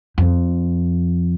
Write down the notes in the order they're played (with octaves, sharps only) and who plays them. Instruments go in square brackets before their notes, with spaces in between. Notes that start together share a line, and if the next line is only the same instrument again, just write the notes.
[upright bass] F2